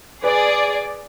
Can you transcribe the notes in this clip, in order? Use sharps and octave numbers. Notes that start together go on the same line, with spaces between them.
G#4 B4 D5